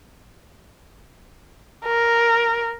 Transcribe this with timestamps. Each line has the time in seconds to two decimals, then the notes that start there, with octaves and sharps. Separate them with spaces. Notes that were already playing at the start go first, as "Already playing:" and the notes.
1.86 A#4